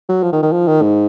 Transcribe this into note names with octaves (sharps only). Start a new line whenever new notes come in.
F#3
F3
D#3
D#3
F3
D#3
G#2